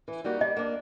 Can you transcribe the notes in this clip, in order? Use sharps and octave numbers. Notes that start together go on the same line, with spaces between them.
E3
G3 A#3 D#4 F#4
G3 D#5
A#3 D4